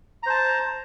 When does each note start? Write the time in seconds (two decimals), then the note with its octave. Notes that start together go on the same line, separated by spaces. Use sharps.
0.23 A#5
0.26 C5
0.30 A5